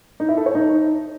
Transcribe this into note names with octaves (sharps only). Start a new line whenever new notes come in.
D#4
E4
A4
C#5
D#4